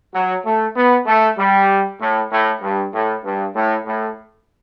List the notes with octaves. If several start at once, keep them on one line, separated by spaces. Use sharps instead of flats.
F#3
A3
B3
A3
G3
A2
A2
G2
A2
G2
A2
A2